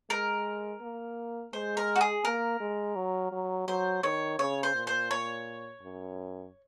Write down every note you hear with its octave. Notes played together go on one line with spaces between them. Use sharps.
G#3 A#4
A#3
G#3 C5
A#4
F#4
G#4
A#3 A#4
G#3
F#3
F#3
F#3 C5
D#3 C#5
C#3 C#5
C5
A#2
C5
C#5
F#2